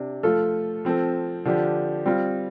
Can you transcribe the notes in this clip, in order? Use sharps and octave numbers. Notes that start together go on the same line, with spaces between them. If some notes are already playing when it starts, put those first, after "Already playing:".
Already playing: C3 D4
F3 A3 F4 A4
F3 C4 A4
D3 F3 D4 G4
G3 C4 F4